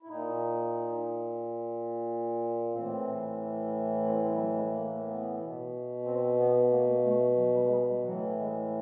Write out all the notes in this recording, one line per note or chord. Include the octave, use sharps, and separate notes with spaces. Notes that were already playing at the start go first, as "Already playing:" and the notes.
E4
A#2 D#4
A2 E3 C4
C4
C4
G3
F#3
G#3
A#3
A#3
B3
B2
C4
B3
A#3
A#3
A3
F#3
G3
G#3
G3
G3
A2 E3 F#3
G#3